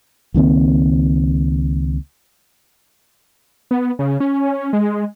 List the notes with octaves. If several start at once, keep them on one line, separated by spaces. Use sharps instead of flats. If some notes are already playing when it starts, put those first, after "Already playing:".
C#2 D#3 A#3 C4
B3
C#3
C#4
G#3